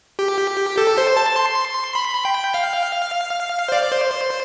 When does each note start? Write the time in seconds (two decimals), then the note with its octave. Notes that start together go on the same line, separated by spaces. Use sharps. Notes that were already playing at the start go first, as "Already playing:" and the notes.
0.19 G4
0.78 A4
0.98 C5
1.17 A5
1.36 C6
1.95 B5
2.25 G5
2.54 F5
3.69 C5
3.72 D5
3.83 D5
3.92 C5
4.11 C5